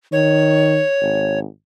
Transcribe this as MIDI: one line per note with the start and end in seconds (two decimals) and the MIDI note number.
0.12 0.81 51
0.12 1.39 73
1.01 1.45 32